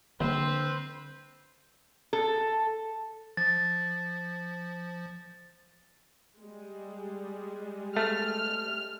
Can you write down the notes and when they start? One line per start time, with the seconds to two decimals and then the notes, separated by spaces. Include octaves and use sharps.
0.21 A#1 D3 C4 B4 C5
2.13 A4
3.37 F3 A6
6.40 G3 G#3
7.97 A3 F6